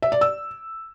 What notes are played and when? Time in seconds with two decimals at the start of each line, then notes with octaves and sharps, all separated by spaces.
0.02 E5
0.12 D5
0.21 E6